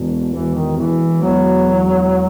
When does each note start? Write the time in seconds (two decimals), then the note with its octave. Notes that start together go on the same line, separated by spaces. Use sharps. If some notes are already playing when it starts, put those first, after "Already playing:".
Already playing: E1 B2
0.32 E1 E3
0.54 D#3
0.77 E2 E3
1.22 E1 F#3
1.67 E2